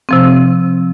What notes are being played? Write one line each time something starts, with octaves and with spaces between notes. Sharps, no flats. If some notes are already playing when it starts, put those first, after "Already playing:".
C3 F3 C4